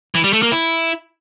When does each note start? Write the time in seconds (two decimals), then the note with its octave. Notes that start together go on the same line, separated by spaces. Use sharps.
0.15 E3
0.24 G3
0.33 A3
0.42 A#3
0.52 E4